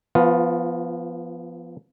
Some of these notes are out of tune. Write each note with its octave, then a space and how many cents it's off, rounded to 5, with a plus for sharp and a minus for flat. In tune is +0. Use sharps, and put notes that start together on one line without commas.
F3 -25 B3 -5 F4 +15